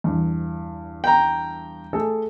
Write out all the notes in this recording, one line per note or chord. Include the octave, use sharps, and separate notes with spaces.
E2 G2
G5 A#5
A3 G#4 A4